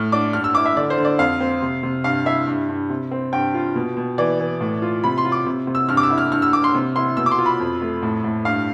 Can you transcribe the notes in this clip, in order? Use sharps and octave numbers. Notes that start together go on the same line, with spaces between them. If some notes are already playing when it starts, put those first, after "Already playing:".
Already playing: A2 F6
D4 D6
G2 F6
E6
E4 D6
E5
D3 D5
C5
D3
D5
F2 F5
C4
C3
C3
G2 F5
E4 E5
G2
G2
C3
C4
G2 G5
F4
B2
B2
E3 D5
E3
A2
F4
C3 B5
C6
F4
D6
C3
C3
E6
G2 F6
D6
E6
E4
F6
G2 F6
E6
G2 D6
C6
C3
E4 C6
B2 E6
D6
C6
F4
B5
F2
A3
A2
A2
G2 F5